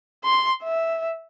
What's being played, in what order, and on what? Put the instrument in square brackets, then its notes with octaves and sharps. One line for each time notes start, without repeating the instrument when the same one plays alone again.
[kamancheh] C6
E5